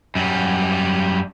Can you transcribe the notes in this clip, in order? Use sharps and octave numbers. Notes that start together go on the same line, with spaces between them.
F#2 G3